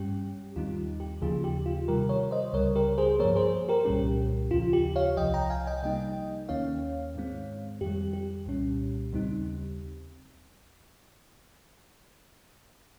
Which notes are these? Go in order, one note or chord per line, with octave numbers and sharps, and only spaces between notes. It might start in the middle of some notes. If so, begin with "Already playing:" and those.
Already playing: G2 G3 C#4 G4
D#2 D#3 G3 C4 D#4 F4
G4
D#2 C#3 F3 A#3 D#4 F4 G#4
G4
F4
C3 D#3 G3 G4 A#4
A#4 C#5
C5 D#5
C#2 C#3 G3 A#4 C#5
G4 A#4
G#4 C5
G2 F3 A#3 A#4 C#5
G#4 C5
G4 A#4
C2 A#2 G3 C#4 G4
D#2 C#3 F3 F4
G4
C#5 F5
C2 C3 F3 D#5 G5
G5 A#5
F5 G#5
D#5 G5
C3 G3 A#3 D#4 D#5 G5
D#2 D#3 A#3 C#4 C#5 F5
G#2 D#3 G#3 C4
F2 D#3 G3 G4
G4
C2 A#2 G3 C#4
D#2 C#3 G3 C4 D#4